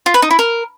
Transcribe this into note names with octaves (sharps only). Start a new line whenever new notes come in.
F4
B4
D#4
E4
A#4